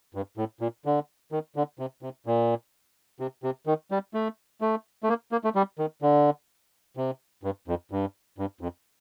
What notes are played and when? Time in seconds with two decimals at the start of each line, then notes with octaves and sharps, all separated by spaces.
0.15 G2
0.37 A2
0.61 A#2
0.85 D3
1.32 D#3
1.56 D3
1.79 C3
2.02 C3
2.26 A#2
3.20 C3
3.43 C3
3.67 D#3
3.91 G3
4.14 A3
4.61 A3
5.03 A3
5.09 A#3
5.32 A#3
5.44 A3
5.55 G3
5.79 D#3
6.02 D3
6.97 C3
7.43 G2
7.68 F2
7.91 G2
8.38 G2
8.61 F2